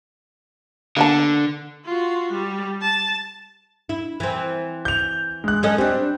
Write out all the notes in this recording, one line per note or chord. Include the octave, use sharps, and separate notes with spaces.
D3 A#3 B3 A5
F4 F#4
G3
A5
E4
E3 C4
G6 F7
G#3 F#6
C#4 A4 D#5
G3 C4 D4